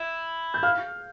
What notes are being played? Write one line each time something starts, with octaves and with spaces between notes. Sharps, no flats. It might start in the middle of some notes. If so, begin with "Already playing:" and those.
Already playing: E4
G6
F5 F6